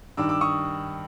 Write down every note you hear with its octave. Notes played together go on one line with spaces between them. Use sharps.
G2 D#3 D6 E6
D6 E6
C#6 D#6